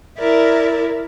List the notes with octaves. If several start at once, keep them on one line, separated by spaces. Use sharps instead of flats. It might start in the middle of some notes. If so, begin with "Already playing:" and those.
E4 A#4 D5 E5